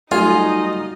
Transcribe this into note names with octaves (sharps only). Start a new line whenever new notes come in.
F#3 G3 A3 D#4 F4 D#5 G#5